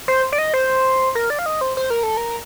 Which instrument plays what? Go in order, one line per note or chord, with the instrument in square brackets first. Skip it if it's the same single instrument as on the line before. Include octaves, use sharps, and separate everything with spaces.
[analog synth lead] C5
D5
D#5
C5
A#4
D5
F5
D#5
C5
C5
A#4
A4
A#4